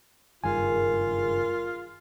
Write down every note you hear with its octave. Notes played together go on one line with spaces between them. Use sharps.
F#1 G2 D#3 F4 G#4 A#4 G#5